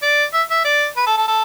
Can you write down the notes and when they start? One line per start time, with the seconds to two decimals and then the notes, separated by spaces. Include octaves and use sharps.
0.03 D5
0.34 E5
0.51 E5
0.65 D5
0.97 B4
1.07 A4
1.17 A4
1.28 A4